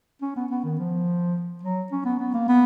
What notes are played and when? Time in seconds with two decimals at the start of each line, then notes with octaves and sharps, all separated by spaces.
0.22 C#4
0.36 B3
0.51 B3
0.64 D#3
0.79 F3
1.63 F#3
1.92 C#4
2.05 B3
2.19 B3
2.34 A#3
2.48 B3